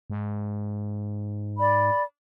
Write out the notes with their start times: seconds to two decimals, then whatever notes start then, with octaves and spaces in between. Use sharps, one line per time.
0.10 G#2
1.58 D5 B5